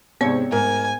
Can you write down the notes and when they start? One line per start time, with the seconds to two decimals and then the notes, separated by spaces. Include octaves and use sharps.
0.21 G#2 C3 B3 C4 C#5
0.52 G#2 A#4 G#5